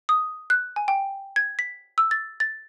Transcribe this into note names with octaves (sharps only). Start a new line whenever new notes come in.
D#6
F#6
G#5
G5
G#6
B6
E6
A6
A6